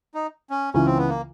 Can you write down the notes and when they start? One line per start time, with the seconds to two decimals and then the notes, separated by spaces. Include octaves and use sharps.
0.14 D#4
0.50 C#4
0.74 C#2 C#3 E3 C#4
0.85 C4
0.98 B3
1.09 A#3